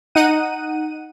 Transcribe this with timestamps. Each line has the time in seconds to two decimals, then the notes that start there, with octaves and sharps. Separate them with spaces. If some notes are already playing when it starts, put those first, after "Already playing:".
0.15 D#4 F#5 D#7